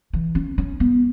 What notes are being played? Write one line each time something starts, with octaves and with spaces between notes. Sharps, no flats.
E3
C#4
C#4
B3